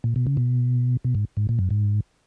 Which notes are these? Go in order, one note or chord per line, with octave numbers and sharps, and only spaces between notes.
A#2
B2
C#3
B2
B2
G#2
G#2
A#2
F#2
G#2